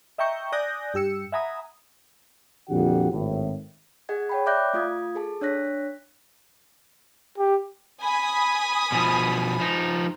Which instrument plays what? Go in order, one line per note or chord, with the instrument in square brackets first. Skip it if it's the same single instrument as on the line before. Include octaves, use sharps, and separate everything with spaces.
[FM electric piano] D#5 E5 G5 A#5 C#6 G6
D5 G#5 D#6 F#6 G6 A#6
G2 G4 E6 C#7
E5 F#5 G#5 A#5 B5 D#6
[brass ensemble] F2 A#2 D3 F#4 G4 F#5
G#1 A2
[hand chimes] G#4 D#5 F#5 G#6
C#5 G5 B5
D5 E5 D6 F#6 G6 A#6
A3 F4 D#6 G#6
G#4 A4 A5
D4 C#5 F#6 A#6 B6
[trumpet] G4
[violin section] G#5 B5 D#6
[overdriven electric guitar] B2 F3
F3 D#4